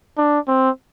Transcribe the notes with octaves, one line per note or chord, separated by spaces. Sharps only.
D4
C4